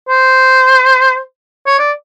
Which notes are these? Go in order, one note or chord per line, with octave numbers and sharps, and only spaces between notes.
C5
C#5
D5